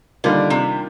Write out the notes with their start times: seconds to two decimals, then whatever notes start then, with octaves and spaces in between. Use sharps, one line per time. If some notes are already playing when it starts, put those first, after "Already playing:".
0.24 D3 D#3 G3 A#3 F4
0.50 C3